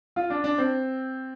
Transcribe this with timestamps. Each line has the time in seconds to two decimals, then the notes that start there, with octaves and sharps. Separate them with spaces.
0.16 F4
0.30 D4
0.44 D4
0.58 C4